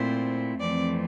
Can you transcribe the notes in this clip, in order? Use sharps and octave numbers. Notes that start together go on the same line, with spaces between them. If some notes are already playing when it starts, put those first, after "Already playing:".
Already playing: A#2 A3 C4 E4 C5
F2 E3 A3 C4 D5